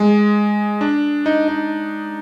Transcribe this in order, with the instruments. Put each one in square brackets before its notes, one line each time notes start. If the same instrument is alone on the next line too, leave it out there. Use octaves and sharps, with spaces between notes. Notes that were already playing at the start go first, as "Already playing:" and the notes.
Already playing: [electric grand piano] G#3
D4
D#4
D#4